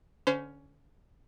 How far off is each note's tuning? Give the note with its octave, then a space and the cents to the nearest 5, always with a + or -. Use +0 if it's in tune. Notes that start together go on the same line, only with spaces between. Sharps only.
D3 +0 C#4 +15 C5 -25